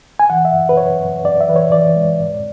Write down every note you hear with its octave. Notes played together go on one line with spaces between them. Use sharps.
G#5
E3 F#5
E5
F#2
B4
F#2 C#5
F#2
F#2 D5
E5
E3 B4
C#5
E3 D5
G#3
G#2